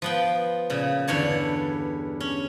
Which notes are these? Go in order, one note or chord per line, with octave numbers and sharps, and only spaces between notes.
F3 B3 G5
A#2 C#3
E2 G2 D3 C#5 A5
C#4